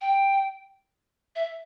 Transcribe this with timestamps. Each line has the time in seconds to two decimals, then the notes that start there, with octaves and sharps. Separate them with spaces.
0.01 G5
1.36 E5